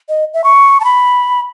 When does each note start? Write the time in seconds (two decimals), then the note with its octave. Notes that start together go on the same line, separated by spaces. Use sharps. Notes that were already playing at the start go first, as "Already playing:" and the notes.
0.09 D#5
0.34 E5
0.44 C#6
0.80 A5
0.85 B5